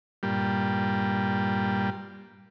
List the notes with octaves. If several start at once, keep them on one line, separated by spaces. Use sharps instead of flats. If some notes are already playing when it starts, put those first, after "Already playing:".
G2 A#2 G3